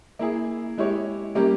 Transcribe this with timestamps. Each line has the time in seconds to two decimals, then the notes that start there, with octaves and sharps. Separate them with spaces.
0.19 A#3 E4 G#4
0.78 G#3 E4 G4 C#5
1.35 G3 A#3 C#4 G4 A#4